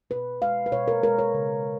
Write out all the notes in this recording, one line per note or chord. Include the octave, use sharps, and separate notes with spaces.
B2 B4
G#3 F5
B4
B2 C#5
A#4
G#3 A#4
C#5
C#3